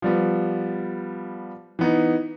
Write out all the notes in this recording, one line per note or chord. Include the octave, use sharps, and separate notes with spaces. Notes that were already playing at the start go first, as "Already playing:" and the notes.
F3 G3 B3
E3 B3 D#4